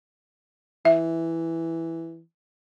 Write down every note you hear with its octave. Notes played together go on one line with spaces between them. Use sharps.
E3 E5